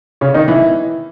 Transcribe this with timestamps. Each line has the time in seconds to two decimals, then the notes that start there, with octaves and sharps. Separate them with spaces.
0.21 C#3 C#4
0.34 D#3 D#4
0.48 E3 E4